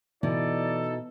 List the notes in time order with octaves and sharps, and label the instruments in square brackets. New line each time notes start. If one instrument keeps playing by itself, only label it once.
[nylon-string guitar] B2 [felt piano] E3 [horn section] D#4 E4 A4 [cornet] D5